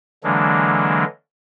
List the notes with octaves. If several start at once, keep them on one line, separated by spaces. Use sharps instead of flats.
D3 E3 F#3 G#3 A#3 D4